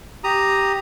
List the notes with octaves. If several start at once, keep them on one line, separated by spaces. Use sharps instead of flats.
G4 A#5 D#6